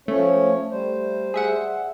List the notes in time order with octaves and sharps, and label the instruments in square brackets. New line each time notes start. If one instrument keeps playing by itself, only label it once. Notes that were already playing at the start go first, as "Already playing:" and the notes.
[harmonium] F3 C#4 C#5 [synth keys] A3
[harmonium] G3 C5
[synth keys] G#4 E5 F#5